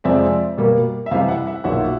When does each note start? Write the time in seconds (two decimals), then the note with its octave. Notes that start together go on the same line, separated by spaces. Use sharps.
0.04 F2 C3 F3 G#3 C4 D5 E5
0.58 B2 G3 A#3
1.06 E5
1.10 C3 E3 G3 D#5 F5
1.28 E5 F#5
1.47 E5 F#5
1.64 B1 A#2 F#3 E5 F#5